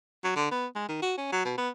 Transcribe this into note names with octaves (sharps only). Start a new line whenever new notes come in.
F#3
D3
B3
G#3
D#3
F#4
C#4
F#3
B2
B3